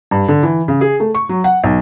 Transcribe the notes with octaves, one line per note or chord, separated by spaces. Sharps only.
G2
D3
E3
C#3
G#4
A3
C#6
F#3
F#5
B1